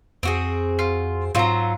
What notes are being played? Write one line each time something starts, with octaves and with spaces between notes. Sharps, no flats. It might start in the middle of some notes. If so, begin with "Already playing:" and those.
F2 C4 F#4 G#4
F4
G#2 F#3 C4 F4 A#5